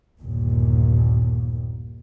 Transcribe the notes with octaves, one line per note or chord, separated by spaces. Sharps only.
G1 D#2 A#2